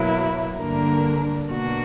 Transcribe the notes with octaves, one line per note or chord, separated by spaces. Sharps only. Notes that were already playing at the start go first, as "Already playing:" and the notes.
Already playing: B2 F#3 A#3 E4
G2 D3 A#3 D4 A#4
B2 A#3 D4 F#4